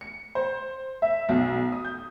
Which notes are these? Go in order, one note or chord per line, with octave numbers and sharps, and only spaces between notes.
C#7
C5
E5
B1
D#6
G6